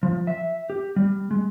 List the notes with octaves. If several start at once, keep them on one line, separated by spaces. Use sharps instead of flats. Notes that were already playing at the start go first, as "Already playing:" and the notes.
F3
E5
G4
G3
G#3